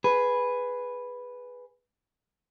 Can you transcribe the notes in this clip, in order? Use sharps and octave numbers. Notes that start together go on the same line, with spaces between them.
G#4 B4